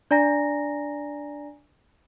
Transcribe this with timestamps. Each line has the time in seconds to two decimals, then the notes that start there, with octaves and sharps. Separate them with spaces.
0.11 D4 D5 G#5 A#5 A#6